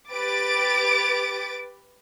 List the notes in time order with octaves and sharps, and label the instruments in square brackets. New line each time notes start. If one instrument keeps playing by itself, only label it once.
[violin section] G4 B4 D6 A6 D7